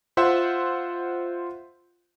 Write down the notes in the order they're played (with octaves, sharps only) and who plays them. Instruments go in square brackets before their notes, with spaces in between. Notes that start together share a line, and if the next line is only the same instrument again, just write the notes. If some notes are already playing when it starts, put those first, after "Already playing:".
[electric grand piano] F4 C5 E5 F#5